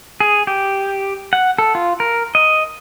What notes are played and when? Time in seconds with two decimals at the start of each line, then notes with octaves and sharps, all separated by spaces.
0.20 G#4
0.47 G4
1.33 F#5
1.58 A4
1.75 F4
2.00 A#4
2.35 D#5